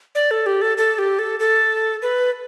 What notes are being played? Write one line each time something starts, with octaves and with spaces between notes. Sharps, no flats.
D5
A4
G4
A4
A4
G4
A4
A4
B4